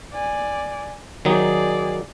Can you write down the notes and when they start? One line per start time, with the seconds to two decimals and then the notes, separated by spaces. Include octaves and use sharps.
0.13 D5 G#5
1.25 D#3 F#3 D#4 G#4 D5